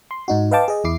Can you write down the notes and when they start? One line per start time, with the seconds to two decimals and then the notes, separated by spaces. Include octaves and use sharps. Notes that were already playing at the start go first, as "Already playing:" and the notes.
0.11 C6
0.28 G#2 D#4 F#4
0.51 B4 D#5 F5 G5 A5 D6
0.68 G#4 D#5
0.84 E2 E4 D6 C7